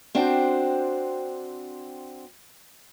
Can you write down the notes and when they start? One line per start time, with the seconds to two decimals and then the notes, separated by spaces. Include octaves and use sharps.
0.15 C4 D4 F#4 C5 G5